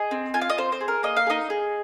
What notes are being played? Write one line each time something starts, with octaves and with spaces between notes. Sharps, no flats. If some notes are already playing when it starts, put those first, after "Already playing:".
Already playing: G#4 D#5
C4
F4 G#5
F5
D#5
C4 C5
C5
G#4
A#4
A#3 D#5
F5
G#4
D#4 D#5
G#4